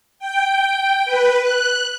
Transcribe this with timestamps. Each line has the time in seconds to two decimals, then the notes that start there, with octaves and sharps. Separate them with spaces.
0.19 G5
1.05 B4
1.41 F#6